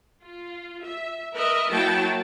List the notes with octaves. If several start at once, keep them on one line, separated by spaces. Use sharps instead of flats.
F4
E5
A#4 B4 D#5 E5
F#3 A#3 E4 F#4 G5 A5